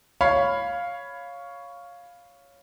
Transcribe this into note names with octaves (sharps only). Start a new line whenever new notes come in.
C#5 F5 B5